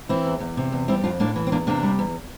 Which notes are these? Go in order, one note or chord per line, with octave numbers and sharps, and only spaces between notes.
E3 C4 E4
E2
E2
C3
E2
G3 C4 E4
F2 D4 F4
A2 A#3 D4
E3
C4
E2 A#3 D4
C3 A#3 D4
G3
E2